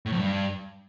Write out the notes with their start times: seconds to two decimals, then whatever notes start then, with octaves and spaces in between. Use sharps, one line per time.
0.06 A2
0.12 F2
0.19 G2